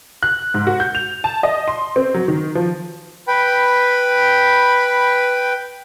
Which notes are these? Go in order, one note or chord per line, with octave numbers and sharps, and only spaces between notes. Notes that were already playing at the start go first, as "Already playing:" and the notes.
F#6
G#2
F#4
G6
F7
A5
D#5
C6
C4
F#3
D#3
F3
B4 G5 B5